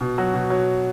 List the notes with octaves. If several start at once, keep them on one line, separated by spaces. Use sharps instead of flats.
B2
F#3 F#4
B2
F#3